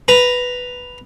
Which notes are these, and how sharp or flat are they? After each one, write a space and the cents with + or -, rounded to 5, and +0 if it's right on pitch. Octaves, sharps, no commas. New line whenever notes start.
B4 +0 A#5 +0